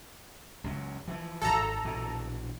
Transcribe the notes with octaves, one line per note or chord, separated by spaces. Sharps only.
C#2 F#2
E3 F3
D1 G#1 A4 A#5
A#1 B2 E3